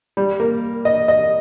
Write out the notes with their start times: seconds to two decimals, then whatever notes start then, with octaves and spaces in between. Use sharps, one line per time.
0.17 G3
0.40 A#3
0.85 D#5
1.08 D#5